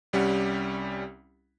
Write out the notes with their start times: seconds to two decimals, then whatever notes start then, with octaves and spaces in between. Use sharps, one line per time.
0.13 C2 G3 C#4 G4 F#5